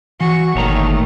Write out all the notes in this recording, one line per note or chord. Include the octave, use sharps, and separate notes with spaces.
E3 F#4
G1 A#2 D#3 A3 C#5 A#5